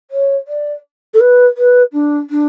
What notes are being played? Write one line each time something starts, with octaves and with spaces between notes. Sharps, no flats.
C#5
D5
A4
B4
B4
D4
D4